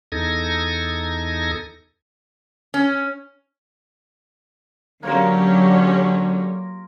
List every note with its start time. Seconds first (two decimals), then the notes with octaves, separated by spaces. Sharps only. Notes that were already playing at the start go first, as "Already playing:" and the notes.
0.12 E2 D#4 A4 G#6 A#6
2.74 C#4
5.03 D3 F#3 A#3 C#4 F4 G4 A#4 C#5